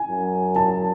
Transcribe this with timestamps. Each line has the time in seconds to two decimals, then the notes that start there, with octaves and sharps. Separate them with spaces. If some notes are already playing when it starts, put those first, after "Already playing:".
Already playing: G#5
0.09 F#2
0.56 A5